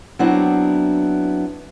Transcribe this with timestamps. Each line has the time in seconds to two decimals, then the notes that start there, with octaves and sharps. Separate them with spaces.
0.19 F#3 B3 C4 D4 E4